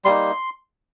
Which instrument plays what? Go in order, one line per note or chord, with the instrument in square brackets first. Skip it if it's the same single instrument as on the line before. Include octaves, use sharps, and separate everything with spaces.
[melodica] G3 A#3 D#4 C6